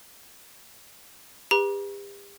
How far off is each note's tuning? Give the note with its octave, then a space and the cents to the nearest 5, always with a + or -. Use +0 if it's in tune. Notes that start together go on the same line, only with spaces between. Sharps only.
G4 +40 B4 +0 A#5 +40